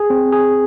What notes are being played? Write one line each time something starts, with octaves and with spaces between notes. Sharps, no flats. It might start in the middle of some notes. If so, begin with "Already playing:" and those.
Already playing: G#4
C4
G#4